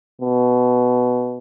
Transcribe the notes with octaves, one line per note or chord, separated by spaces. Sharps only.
B2